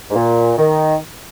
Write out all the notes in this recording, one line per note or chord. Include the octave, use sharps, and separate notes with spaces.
G#2
A#2
D#3